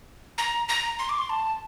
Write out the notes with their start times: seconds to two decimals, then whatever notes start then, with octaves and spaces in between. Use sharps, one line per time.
0.38 A#5
0.69 A#5
0.99 C6
1.09 D6
1.18 C6
1.30 A5